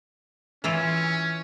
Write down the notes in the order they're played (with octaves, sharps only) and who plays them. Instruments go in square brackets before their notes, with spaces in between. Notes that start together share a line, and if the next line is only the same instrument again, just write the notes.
[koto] E3 E4 F4 [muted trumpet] C#4